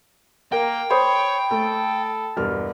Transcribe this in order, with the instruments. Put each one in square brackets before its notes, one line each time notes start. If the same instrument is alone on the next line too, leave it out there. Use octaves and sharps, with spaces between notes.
[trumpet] A#3 [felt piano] A#4 [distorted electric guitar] G5
[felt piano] C5 [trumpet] C#5 [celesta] B5 D#6
[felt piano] A3 [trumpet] A4
[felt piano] E1 G2 F6